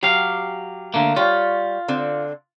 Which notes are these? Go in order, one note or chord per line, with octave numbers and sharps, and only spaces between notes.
F#3 G4 F5
D3 A3 A#3
G3 F4 C#5
D3 C4